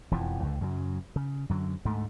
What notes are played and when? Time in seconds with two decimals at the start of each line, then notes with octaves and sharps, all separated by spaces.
0.11 E1 F2 E3 F3
0.43 C#2 D3
0.61 F#2 C#3 F3 F#3
1.16 C#3
1.49 F#2 D3 F#3
1.85 D2 G#2 A3